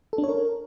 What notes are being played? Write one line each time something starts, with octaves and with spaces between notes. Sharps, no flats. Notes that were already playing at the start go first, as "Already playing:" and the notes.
A4
D4
C#5
A#4